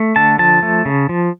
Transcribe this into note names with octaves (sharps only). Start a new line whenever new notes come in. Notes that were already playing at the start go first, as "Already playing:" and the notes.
Already playing: A3
D3 A5
F3 A5
A3
C#3
F3